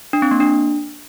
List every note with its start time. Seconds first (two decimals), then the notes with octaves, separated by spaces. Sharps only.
0.13 D4
0.22 C4
0.31 A#3
0.40 D4